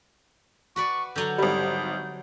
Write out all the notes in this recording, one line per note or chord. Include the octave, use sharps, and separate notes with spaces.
F#4 B4 D5 C#6
D3 F#3 A#5 G6
G#1 G3